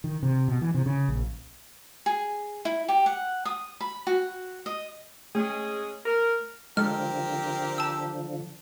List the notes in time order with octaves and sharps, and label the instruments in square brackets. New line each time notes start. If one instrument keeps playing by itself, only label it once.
[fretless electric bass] D#3
C3
B2
E3
C3
C#3
A#1
[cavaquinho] G#4
E4
G4
F#5
D#6
B5
F#4
D#5
[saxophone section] G#3 C#4 G#4 [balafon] A3
[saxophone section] A#4
[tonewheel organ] D3 F3 [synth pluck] G#3 A4 [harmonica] C4 G4 A#4 [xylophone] F6
[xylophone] A5 E6